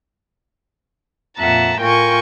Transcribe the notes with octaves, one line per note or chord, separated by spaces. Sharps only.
F2 A#2 E5 F#5 A5 A#5
A2 F4 A#4 G5 G#5 C#6